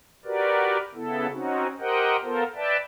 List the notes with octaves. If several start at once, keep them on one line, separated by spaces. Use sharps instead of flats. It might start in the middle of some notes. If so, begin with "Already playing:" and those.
F#4 G4 A#4 B4 D5
C#3 B3 E4 A4
C4 C#4 D#4 F#4
G4 A#4 C5 D#5 F#5 G5
B3 F4 A4 A#4 C5
B4 D5 E5 G5 A5